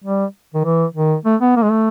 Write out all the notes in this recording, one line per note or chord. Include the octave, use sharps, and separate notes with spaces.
G3
D#3
E3
D#3
A3
B3
A#3
G#3
A3